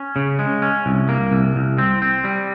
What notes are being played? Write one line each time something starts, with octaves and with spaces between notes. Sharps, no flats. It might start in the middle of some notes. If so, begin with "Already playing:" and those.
Already playing: C#4
C#3
G#3
C#4
C2
A#3
C2
C2
C4
C4
G3